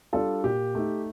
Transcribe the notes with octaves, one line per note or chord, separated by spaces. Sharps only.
G3 D4 F4 A4
A#2 G4
A3 D#4